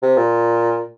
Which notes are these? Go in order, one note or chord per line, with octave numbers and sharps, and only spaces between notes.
C3
A#2